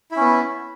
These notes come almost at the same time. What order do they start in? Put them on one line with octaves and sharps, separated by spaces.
E4 C#4 B3